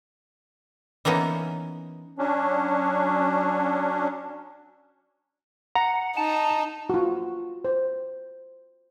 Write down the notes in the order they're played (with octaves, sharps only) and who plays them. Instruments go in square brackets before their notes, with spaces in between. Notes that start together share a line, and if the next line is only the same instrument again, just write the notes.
[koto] E3 A#3 B3 C#4 D#4
[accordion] F#3 C#4 D4
[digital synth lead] F#5 [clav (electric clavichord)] A#5
[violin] D#4 [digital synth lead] A5
[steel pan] F4 F#4
C5